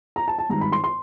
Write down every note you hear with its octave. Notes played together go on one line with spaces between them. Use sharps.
A#5
A5
A5
G#1 G2 D#3 A#5
B5
C6
C6